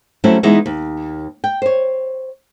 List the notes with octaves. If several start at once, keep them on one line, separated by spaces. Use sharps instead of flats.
F#3 G3 A3 C4 C#4 E4
E3 G#3 B3 D#4 E4
D#2
G5
C5 C#5